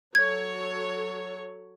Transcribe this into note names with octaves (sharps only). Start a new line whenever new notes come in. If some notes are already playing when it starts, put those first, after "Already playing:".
F#3 A4 C#5 G#6